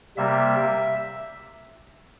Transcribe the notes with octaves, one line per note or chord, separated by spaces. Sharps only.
C3 G3 A#3 E5